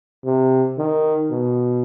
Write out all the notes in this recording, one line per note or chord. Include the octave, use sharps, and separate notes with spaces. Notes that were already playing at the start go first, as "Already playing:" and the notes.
C3
D#3
B2